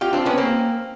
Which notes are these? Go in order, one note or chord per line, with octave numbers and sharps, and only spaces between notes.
F4 G4
C4 D4
B3 C#4
A#3 C4